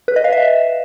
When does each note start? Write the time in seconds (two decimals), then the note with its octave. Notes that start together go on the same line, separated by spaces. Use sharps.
0.08 B4
0.16 D#5
0.24 F5
0.32 E5